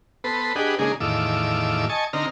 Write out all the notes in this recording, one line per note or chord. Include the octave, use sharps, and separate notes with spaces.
B3 A4 B4 C5
D4 G4 G#4 B4 D#5 F#5
C#3 G#3 A#3 D4 D#4 G#4
E2 A2 D#3 F4 D6 E6
D#5 G#5 A5 C#6
D3 C4 D#4 A#5 F6